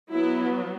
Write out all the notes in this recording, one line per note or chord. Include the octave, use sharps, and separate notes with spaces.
F#3 B3 E4